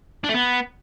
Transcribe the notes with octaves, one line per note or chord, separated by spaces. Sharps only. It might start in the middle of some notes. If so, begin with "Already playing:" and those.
D4
A3
B3